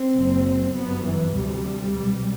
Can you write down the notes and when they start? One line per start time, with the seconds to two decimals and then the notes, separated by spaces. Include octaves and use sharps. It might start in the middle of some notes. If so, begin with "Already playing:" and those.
Already playing: C4
0.15 F#1 F#2
0.74 G1 F#2 B3
1.04 E3
1.34 D2 C3 G3
1.64 G3
1.93 C2 B2